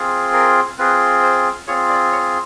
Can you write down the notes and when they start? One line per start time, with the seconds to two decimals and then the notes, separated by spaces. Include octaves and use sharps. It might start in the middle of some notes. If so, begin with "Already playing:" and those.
Already playing: C4 F4 G#4
0.33 A#4
0.78 C4 F4 G#4 B4
1.23 C5
1.67 C4 F4 G#4 C#5
1.89 D5
2.12 C#5